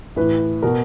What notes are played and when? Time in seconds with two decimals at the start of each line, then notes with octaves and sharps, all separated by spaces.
0.16 A2 E3 B4
0.62 B2 A#4